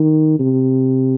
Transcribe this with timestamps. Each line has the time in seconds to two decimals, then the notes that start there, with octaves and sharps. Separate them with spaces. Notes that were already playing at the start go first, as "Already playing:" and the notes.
Already playing: D#3
0.40 C3